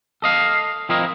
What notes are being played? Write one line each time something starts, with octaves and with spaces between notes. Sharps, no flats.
A4 D#5 F5
F3 C4 E4 F4 A#4 D#5